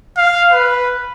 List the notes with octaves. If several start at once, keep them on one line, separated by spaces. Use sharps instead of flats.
F5
B4